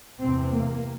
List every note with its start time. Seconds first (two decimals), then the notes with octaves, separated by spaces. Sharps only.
0.22 E2 C3 C4
0.52 A#3